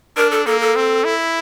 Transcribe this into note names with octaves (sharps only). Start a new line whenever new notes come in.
D4 A#4
A4
A#3 A4
A4
C4
E4